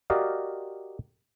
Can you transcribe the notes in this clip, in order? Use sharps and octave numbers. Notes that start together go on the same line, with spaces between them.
F#4 G4 A#4 D5 D#5 F5